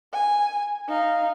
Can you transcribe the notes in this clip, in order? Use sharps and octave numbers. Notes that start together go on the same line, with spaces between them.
G#5
D#4 F5